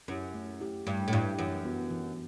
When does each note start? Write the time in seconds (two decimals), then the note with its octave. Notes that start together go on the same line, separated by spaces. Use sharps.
0.08 F#2 C#4 E4 G4
0.34 A3
0.60 E4 G4
0.86 G2 A3
1.08 A2
1.12 G2 E4 G4
1.38 F#2 E3
1.64 B3 F#4
1.90 E3